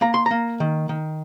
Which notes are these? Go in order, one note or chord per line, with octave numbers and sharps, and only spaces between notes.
A#3 A#5
C6
A#3 A#5
D#3
D#3